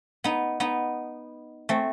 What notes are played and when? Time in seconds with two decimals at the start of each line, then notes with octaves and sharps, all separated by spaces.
0.24 B3 D#4
0.60 B3 D#4
1.69 A3 C4